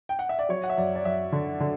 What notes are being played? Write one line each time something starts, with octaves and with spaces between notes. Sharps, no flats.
G5
F#5
E5
D5
F#3 C#5
F#5
E5
F#2 D5
D5
F#2 E5
D3
D3